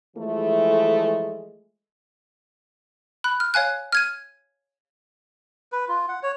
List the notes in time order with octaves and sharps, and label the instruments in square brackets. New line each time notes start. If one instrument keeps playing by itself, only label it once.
[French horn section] E3 F3 G#3 A3
[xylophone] B5 F#6
F6
C#5 F5 G#5 F#6
F6 G#6 D#7
[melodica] B4
F4
F#5
C#5